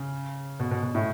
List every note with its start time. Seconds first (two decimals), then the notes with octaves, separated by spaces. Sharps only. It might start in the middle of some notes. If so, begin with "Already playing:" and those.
Already playing: C#3
0.60 B2
0.71 B2
0.83 B2
0.95 A2